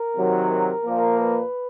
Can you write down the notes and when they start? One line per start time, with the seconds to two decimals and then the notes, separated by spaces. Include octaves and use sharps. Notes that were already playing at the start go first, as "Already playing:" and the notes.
Already playing: A#4
0.16 C3 D#3 F#3
0.51 A#4
0.85 A#2 F3 A#3
1.20 B4